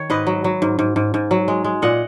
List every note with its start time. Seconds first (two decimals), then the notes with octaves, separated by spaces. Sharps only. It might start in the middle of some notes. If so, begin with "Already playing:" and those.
Already playing: D#3 C#5
0.10 G#2 B4 D#5
0.27 F#3
0.44 F#3
0.62 G#2
0.79 G#2
0.96 G#2
1.14 G#2
1.31 F#3
1.48 G#3
1.64 G#3
1.82 A#2 D#5 F#5